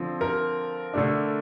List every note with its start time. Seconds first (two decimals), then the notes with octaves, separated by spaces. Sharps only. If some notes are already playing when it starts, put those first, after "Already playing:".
Already playing: D3 F3 C4
0.21 A#4
0.93 D3 A3 D4